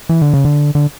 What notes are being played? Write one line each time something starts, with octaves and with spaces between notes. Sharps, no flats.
E3
D3
C#3
D3
D3